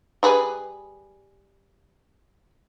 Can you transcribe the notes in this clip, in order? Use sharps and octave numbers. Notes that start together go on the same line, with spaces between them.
G3 G#4 B4